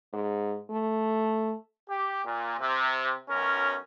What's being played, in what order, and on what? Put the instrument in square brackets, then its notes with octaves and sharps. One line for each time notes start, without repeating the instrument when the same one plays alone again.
[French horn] G#2
A3
[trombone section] G4
A#2
C3
B1 F#2 C#4 A#4